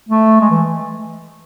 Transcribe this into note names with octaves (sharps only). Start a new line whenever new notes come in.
A3
G#3
E3